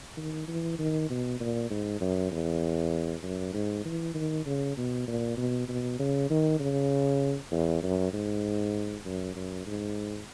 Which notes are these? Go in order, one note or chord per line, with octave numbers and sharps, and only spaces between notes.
D#3
E3
D#3
B2
A#2
G#2
F#2
E2
F#2
G#2
E3
D#3
C#3
B2
A#2
B2
B2
C#3
D#3
C#3
E2
F#2
G#2
F#2
F#2
G#2